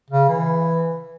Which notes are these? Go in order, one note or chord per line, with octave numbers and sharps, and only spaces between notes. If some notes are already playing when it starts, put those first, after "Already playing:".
C#3
E3